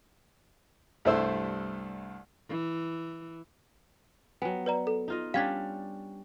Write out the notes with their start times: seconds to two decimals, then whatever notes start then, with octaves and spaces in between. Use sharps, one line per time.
1.05 C2 G2 A3 E4 C5 E6
2.49 E3
4.42 F#3 B3 G5 G#5
4.66 B4 D5 A#5
4.87 A4
5.08 D#4 F4 D#5
5.34 G3 C#4 D4 F5 G#6 B6